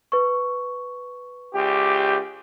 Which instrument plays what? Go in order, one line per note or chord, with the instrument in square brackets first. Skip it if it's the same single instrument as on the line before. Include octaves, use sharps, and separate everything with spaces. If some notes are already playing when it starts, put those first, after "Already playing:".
[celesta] B4 C#6
[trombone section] C#2 G4